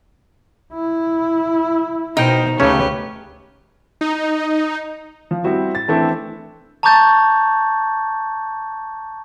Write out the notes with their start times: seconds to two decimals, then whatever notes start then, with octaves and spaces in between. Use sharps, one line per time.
0.73 E4
2.17 B2 D#4 A#4 C5 D#5 G5
2.60 D2 C#3 A3 C#4 G4 B4 C#5
4.01 D#4
5.31 F3
5.44 G3 C4 E4 F#4
5.75 A6
5.88 E3 A3 C4 D4 E4
6.83 A5 A#5 C#6 D6 G6 A6